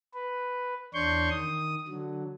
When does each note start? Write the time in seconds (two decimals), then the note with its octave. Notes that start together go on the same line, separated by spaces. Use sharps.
0.14 B4
0.94 E2 D4 C#5 C6 C#6 G6
1.31 D#3 D#6
1.88 D3 F#3